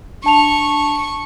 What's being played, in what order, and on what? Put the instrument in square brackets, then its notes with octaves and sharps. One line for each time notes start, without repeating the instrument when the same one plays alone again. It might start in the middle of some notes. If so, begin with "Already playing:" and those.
[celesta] D4 A5 F7 [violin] C#6